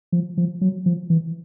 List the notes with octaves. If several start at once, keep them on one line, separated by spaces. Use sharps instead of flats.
F3
F3
F#3
F3
E3